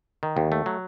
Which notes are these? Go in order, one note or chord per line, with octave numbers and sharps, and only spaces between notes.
D#3
D#2
A3
F#3